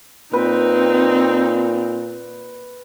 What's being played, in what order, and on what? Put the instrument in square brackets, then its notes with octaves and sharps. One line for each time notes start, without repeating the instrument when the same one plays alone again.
[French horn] A#2 [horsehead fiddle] C4 D#4 [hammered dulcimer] B4